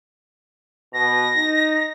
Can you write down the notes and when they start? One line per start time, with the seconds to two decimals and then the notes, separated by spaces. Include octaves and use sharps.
0.94 B2 A#6
1.37 D#4